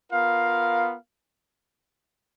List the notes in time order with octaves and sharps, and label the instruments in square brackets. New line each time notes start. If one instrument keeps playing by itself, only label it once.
[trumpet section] B3 F4 A#4 F5